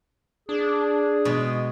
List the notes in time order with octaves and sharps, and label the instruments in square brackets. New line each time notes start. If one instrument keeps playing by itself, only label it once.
[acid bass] D4 [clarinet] G#4
[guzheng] B2 G#3